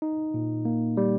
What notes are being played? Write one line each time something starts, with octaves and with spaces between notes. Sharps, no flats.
D#4
A#2
A#3
G3